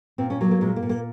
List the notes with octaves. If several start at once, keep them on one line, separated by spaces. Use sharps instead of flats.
A#2 C4
C#4
F#3 A#3
A#3
A#2 G#3
A#3
A#2
A#3